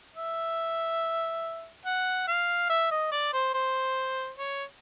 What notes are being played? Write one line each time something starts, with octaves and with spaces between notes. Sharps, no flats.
E5
F#5
F5
E5
D#5
D5
C5
C5
C#5